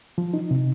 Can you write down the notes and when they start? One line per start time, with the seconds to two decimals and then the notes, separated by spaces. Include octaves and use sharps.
0.18 F3
0.34 D#4
0.51 C3